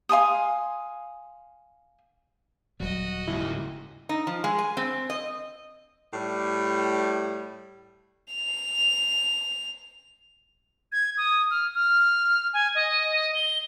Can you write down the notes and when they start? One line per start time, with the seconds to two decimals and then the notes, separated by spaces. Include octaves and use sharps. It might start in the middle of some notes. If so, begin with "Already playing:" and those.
0.09 F5 G#5 C6 D#6
2.80 D#1 F#3 G3 F#4 D#5
3.28 G#2 C#3 E4
4.09 D#4
4.27 F3
4.44 G#3
4.58 G#5
4.77 C4
5.10 D#5
6.13 A2 G3
8.33 F7
10.92 G#6
11.17 D#6
11.51 F6
11.74 F6
12.54 G#5
12.75 D#5
13.34 G7